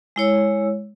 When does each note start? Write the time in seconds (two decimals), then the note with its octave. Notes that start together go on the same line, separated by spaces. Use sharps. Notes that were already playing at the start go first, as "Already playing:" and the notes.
0.16 G#3 E4 C#5 E6